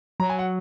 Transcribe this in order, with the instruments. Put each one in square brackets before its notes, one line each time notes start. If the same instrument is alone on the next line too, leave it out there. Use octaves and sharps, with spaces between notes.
[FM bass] F#3 [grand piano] A#5
[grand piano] G#5
F#5